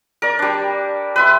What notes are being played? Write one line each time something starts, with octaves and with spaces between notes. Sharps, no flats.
A#4 D5
G3 D4
B4 E5 C6